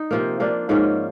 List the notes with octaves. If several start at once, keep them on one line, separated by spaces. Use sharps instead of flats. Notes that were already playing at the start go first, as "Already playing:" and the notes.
Already playing: D#4
C3 F3 A#3
F3 A#3 D4
G#2 F3 A#3 C#4